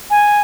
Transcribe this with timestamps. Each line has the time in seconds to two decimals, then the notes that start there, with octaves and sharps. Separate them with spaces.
0.10 G#5